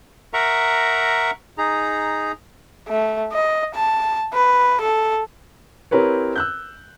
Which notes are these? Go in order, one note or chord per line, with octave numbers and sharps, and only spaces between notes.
A#4 E5 F#5 A#5 C#6
D#4 G#4 A#5
A3
D#5
A5
B4
A4
C4 E4 G4 A#4 B4 C#5
E6 F#6 G6